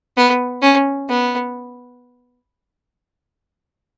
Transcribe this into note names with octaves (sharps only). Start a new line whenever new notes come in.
B3
C#4
B3